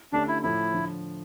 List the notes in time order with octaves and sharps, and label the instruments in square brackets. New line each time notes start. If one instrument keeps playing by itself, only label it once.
[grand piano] D3 A3 C#4 G4 [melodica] D4
[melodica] E4
[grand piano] A2 F3 A3 [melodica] E4
[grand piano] D3 F3